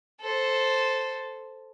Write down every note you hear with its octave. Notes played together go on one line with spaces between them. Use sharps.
A4 C5